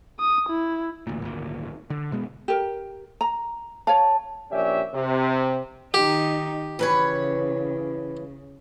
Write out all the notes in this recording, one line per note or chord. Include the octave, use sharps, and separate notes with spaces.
D#6
E4
A1 D2 A#2
G#1 D2 A#2
D3
B2 G#3 B3
G4 A#4
A#5
C#5 F5 A5
A#1 C#4 G4 D5 E5
C3
D#3 D#4 G4
C#3 E3 B4 C#5